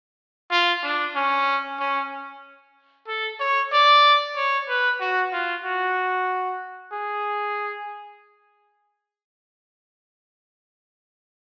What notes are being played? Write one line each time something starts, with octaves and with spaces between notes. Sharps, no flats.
F4
D4
C#4
C#4
A4
C#5
D5
C#5
B4
F#4
F4
F#4
G#4